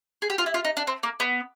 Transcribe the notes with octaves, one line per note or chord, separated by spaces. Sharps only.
G#4
G4
F4
E4
F4
D#4
D4
C4
A#3
B3